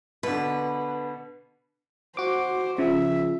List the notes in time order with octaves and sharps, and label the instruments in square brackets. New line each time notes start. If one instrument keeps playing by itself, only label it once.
[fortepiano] B2 D3 [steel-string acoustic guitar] B4
[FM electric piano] F#4 D6 [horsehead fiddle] C5
[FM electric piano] C#3 F3 [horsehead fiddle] E5